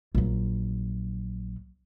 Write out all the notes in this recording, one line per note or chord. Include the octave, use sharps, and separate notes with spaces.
A#1 F#3